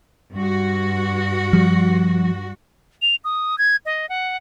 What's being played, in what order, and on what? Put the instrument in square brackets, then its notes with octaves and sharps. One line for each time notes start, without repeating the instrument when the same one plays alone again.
[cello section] G2 F#4
[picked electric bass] F3 G3
[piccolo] F7
D#6
G#6
D#5
F#5